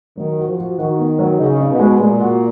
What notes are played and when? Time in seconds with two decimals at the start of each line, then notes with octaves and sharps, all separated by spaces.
0.17 D#3 F#3
0.38 F#4
0.48 F3
0.58 F#4
0.78 D#3 F#4
0.98 B3
1.19 F#3
1.39 C#3 D#4
1.60 D#4
1.70 B2
1.79 G#3
1.99 A#2 G#3
2.20 F#4